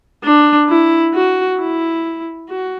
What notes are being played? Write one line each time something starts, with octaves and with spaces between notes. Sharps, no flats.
D4
E4
F#4
E4
F#4